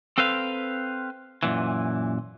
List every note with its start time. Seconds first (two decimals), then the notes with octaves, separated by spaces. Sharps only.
0.18 C4 A4 B4 C5 F5
1.43 F#2 A#2 E3